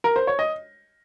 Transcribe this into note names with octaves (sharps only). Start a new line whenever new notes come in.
A#4
C5
C#5
D#5